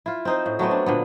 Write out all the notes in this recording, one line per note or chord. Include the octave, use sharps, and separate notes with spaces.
E4 F4
C4 D#4 C5
A2
F#3 A3 B3 C4
D4
A#2 D3 B3